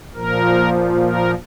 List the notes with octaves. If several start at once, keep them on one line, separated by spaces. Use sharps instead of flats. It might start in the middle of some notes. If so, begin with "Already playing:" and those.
A#2 F3 A#4
A#4